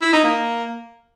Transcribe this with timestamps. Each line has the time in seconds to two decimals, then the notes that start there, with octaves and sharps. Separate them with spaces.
0.02 E4
0.13 D#4
0.24 A#3